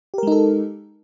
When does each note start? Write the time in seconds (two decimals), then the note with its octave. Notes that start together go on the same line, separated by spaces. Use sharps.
0.14 G4
0.18 A#4
0.23 G#3
0.27 D#4
0.32 A4